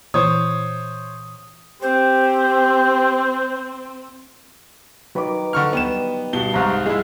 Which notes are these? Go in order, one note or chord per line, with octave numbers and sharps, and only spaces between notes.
A#2 E3 C5 C#5 D#6
C4 G4 C5
D#3 F#3 B4 D6
D3 C#6 F6
G3 B3 E7
G2 B2 G7
C2 G#2 F5 A#5 C#6 F#6
G#3 E4 G#4